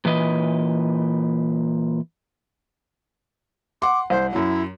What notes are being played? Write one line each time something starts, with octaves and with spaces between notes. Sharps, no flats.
A#2 E3 B4 D#5
F#5 C6 D6
C2 C5
F#2 F#3 E4